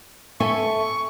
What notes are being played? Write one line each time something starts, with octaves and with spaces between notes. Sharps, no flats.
A4 E5 G#5 C#6